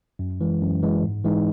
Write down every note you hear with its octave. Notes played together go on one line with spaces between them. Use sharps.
F#2
E3 G#3
F#2
E3 G#3
G#2
E3 G#3 D#4